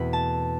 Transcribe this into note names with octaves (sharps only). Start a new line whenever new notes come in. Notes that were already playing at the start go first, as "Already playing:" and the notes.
Already playing: E2 B2 A3 C4 B5
A5